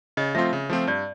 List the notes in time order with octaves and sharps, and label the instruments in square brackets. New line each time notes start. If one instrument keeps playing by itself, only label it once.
[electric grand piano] C#3 [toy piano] D#5
[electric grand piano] F3 A3 C4 F4 [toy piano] E5
[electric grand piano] C#3
F3 A3 C4 F4
[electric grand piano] G2 [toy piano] D5